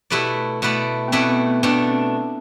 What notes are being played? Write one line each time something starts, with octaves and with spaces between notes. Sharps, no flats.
B2 A3 E4 G4 B4 D5
B2 A3 E4 B4 D5
B3
B2 A3 C4 E4 B4 D5
B3
B3
B2 A3 B3 D4
C4